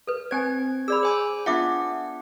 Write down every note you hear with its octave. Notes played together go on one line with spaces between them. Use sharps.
A4 B4
C4 C5 G5 G#5 G#6
G#4 D5 B5 E6
C5 G#5 D6
B3 D4 F4 E5 F#5 D6